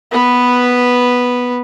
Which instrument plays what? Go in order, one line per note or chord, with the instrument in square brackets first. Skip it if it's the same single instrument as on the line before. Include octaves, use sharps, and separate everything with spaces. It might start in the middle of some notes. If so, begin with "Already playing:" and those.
[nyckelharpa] B3 B4